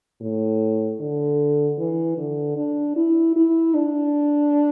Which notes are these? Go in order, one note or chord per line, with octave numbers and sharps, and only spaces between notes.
A2
D3
E3
D3
D4
E4
E4
D4